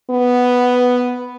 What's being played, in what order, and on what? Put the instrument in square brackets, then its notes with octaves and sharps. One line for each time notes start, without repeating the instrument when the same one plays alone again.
[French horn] B3